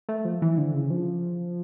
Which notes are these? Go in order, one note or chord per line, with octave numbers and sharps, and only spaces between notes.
A3
F3
E3
D3
C#3
F3